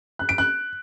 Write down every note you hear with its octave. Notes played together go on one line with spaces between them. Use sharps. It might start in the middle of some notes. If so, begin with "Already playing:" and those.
F#6
D7
F#6